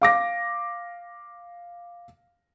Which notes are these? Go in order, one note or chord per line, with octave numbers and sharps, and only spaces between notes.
F5 D6 A#6